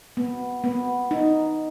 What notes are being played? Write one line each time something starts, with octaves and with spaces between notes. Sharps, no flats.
B3
B3
D#4